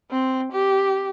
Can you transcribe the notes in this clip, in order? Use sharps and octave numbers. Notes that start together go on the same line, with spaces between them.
C4
G4